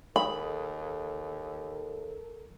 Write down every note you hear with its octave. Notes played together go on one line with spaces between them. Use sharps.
D#2 G#3 A4 A#4 D#5 B5